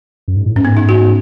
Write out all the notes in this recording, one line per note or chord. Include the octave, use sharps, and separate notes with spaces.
F#2
G#2
A2
G#2 C#4
B3
B3 D#4
D#4 F#4